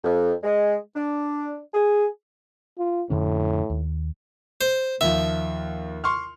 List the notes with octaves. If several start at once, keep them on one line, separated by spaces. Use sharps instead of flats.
F2
G#3
D4
G#4
F4
F2 A2 D3 C#4
D#2
C5
D#2 F3 E5
C6 C#6 F6